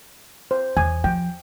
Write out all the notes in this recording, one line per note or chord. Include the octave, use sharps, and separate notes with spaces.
C5
E2 G#5
F3 G5